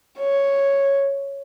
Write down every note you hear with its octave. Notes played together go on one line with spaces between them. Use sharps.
C#5